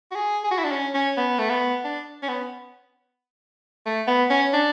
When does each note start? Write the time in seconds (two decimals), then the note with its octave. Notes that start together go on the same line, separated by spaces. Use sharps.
0.12 F#4
0.15 G#4
0.44 G#4
0.51 F#4
0.58 E4
0.64 D4
0.72 C#4
0.94 C#4
1.17 B3
1.39 A3
1.50 B3
1.84 D4
2.23 C#4
2.28 B3
3.86 A3
4.08 B3
4.30 C#4
4.53 D4